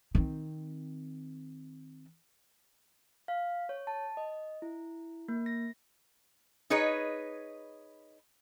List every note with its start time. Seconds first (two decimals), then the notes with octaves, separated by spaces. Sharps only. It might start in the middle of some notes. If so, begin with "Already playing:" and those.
0.15 D#3 C4
3.28 F5
3.69 C#5
3.87 A5
4.17 D#5
4.62 E4
5.28 A#3
5.46 A#6
6.70 D#4 G#4 B4 C#5 D#5